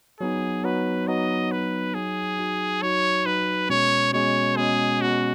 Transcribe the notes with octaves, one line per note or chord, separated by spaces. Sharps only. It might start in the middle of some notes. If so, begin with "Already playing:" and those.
F#3 B3 D#4 G#4
F#3 B3 D#4 B4
F#3 B3 D#4 D#5
F#3 B3 D#4 B4
F#3 D#4 F#4 G#4
F#3 D#4 F#4
F#3 D#4 F#4 C#5
F#3 D#4 F#4 B4
B2 G#3 C#4 C#5
B2 G#3 C#4 C#5
B2 G#3 C#4 G#4
B2 G#3 C#4 F#4